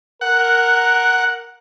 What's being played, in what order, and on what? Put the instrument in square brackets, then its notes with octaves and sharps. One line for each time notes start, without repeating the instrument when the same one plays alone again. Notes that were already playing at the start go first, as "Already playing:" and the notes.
[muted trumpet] A#4 [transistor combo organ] F#5